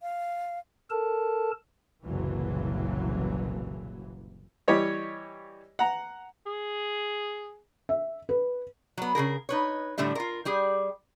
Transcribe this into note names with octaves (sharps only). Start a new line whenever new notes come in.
F5
A4 A#4 A5
F#1 C2 A#2 E3 F#3
E3 G3 G4 C#5 D#5
F#5 A#5
G#4
E5
B4
F#3 B3
C#3 E3 G#4 A#4
D#4 B4 C#5
A2 D3 G3 A3 E5
F4 A#4
G3 G4 G#4